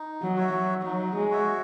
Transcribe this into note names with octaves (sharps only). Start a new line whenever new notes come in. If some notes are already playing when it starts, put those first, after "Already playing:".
Already playing: D#4
F#3
F#4 C#5 E5
F#3
F#3 D#4
G#3
F#4 C#5 E5